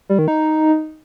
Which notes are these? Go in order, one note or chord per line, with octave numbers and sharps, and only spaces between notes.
G3
D#3
D#4